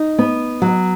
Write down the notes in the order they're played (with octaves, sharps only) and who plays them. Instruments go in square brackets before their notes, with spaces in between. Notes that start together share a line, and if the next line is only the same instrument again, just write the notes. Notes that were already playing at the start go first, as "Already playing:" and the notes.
Already playing: [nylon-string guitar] D#4
B3
F#3